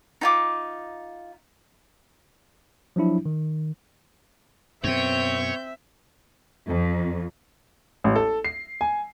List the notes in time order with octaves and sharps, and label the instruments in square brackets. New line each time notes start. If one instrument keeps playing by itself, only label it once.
[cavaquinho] D#4 F4 D6
[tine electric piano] F3 F#3 D4 E4
D#3
[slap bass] F#2 B2 [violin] C4 G6 [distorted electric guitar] C#5 [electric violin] E5
[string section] F2
[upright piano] A1
A4
C7
G#5